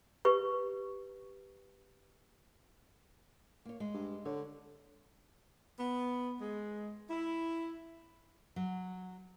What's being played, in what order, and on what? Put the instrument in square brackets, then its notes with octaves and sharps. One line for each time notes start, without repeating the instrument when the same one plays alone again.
[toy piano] G4 B4 C#6
[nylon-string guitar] A#3 C#5
G#3
[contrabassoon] G2
[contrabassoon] D3 [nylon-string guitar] C#5
[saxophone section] B3
G#3
E4
[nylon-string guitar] F#3